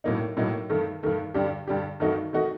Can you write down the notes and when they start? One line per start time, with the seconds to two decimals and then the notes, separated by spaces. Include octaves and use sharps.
0.04 A2 F#3 A#3 D#4
0.37 A2 F#3 A#3 D#4
0.70 G2 D#3 A3
1.03 G2 D#3 A3
1.34 G2 D3 G3 D4 G4
1.68 G2 D3 G3 D4 G4
2.00 G2 D#3 A3 D#4 F#4
2.33 D#3 A3 D#4 F#4